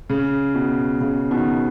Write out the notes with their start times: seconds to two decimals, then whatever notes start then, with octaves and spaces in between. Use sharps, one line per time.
0.10 C#3
0.55 B2
1.01 C#3
1.31 B2 D#3